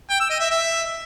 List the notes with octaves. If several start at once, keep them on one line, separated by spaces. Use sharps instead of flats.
G5
E6
D#5
E5
E5